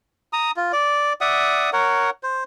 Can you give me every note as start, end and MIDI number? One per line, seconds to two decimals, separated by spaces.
0.33 0.51 82
0.33 0.51 87
0.56 0.72 65
0.73 1.13 74
1.21 1.70 74
1.21 1.70 76
1.21 1.70 78
1.21 1.70 87
1.73 2.10 70
1.73 2.10 73
1.73 2.10 78
2.23 2.44 72